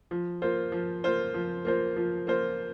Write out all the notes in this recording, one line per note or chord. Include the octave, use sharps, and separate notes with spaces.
F3
A#3 F4 C5
F3
A#3 F4 C5
F3
A#3 F4 C5
F3
A#3 F4 C5